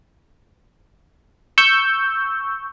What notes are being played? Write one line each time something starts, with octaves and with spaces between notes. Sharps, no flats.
C#6 E6 G6